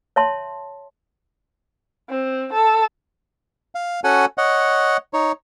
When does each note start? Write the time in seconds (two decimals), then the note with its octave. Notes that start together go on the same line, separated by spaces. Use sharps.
0.16 C#5 E5 A5 C6
2.09 C4
2.53 A4
3.75 F5
4.04 C#4 F#4 A4 F#5 G#5
4.38 C#5 D#5 F#5
5.13 D#4 C#5